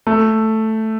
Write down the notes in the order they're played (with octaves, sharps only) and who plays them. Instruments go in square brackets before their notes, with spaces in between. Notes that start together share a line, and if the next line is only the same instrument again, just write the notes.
[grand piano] A3